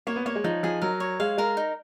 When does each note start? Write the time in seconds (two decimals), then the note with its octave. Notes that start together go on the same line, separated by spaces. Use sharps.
0.07 A#3 C#5
0.16 B3
0.26 A#3 C#5
0.35 G#3
0.44 F3 D#4
0.63 F3 G#4
0.82 F#3 A#4
1.00 C#5
1.20 G#3 F5
1.38 G#3 A#4
1.57 D#4